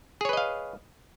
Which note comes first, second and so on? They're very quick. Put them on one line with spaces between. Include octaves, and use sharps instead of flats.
G#4 C#5 B4 D#5 F5